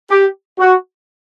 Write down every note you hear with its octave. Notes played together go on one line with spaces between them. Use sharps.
G4
F#4